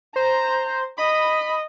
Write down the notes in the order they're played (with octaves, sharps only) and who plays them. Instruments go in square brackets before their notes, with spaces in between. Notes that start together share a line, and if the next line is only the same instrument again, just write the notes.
[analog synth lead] C5 [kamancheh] A#5
[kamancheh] D#5 [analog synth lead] B5